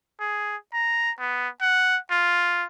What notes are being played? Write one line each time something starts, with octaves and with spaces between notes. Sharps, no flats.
G#4
A#5
B3
F#5
F4